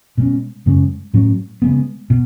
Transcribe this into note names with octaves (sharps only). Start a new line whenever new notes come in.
B2 G#3 C#4
F#2 C#3 G#3 C#4
A2 F#3 C#4
C#3 G#3 B3
B2